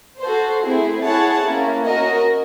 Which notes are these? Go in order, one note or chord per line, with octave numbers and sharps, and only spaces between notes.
F#4 A4 C5
A3 C4 E4 G#4
E4 G#4 C#5 F#5 A5
A#3 C#4 E4
C#4 F#4 A#4 D#5